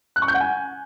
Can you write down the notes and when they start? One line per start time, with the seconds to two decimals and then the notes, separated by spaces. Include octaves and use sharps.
0.16 F#6
0.22 C#6
0.28 G6
0.34 F#5
0.40 G#5